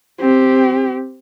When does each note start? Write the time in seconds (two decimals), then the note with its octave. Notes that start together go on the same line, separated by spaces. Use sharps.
0.20 C4 G4